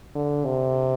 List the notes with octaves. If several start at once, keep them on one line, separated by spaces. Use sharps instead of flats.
D3
C3